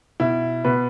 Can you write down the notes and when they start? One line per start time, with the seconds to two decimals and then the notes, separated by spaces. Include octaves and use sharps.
0.20 B2 E4
0.64 B2 B4